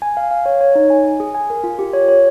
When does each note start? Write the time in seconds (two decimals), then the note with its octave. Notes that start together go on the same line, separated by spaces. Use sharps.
0.02 G#5
0.17 F5
0.31 F5
0.46 C#5
0.61 C#5
0.75 D#4
0.90 G#5
1.05 G#5
1.20 G#4
1.35 G#5
1.50 A#4
1.64 F4
1.79 G4
1.94 C#5
2.08 C#5